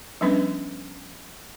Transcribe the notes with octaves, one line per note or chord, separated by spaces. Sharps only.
F3 G3 B3 C#4 D4 B4